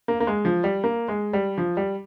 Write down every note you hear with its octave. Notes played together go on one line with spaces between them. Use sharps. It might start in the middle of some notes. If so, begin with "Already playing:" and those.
A#3
A#3
G#3
F3
G3
A#3
G#3
G3
F3
G3